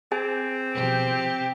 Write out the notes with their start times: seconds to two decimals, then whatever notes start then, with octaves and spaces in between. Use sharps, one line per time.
0.12 C4 G#4 G#5
0.74 B2 F3 G4
1.11 C3